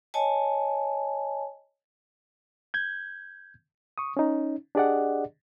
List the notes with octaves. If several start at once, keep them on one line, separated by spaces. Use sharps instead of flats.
C#5 D#5 G#5 A5
G6 G#6
C#6 D#6
C#4 D#4
D4 G4 G#4 D5 D#5 F#5